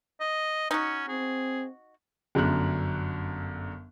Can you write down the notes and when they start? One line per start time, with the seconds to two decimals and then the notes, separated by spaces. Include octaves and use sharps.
0.20 D#5
0.71 C#4 D#4 F#4
1.08 C4 G#4
2.35 G1 F#2 D3 F#6